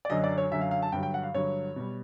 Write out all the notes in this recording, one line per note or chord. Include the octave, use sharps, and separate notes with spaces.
D5
F#2 D3 F#3 D#5
D5
C#5
F#2 D3 F#3 E5
F5
F5
A5
G2 D3 F#3 G5
G5
F#5
F5
G2 D3 F#3 C#5
B2 G3